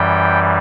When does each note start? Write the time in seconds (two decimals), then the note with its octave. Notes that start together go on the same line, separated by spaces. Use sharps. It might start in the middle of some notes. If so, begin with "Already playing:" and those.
Already playing: F#2 E3 G3 G5